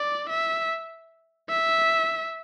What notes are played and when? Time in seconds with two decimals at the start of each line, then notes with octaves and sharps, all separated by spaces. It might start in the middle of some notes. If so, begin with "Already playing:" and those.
Already playing: D5
0.30 E5
1.50 E5